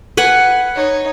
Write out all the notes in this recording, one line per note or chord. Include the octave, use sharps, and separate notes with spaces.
B4 F#5 G#5
D#4 C#5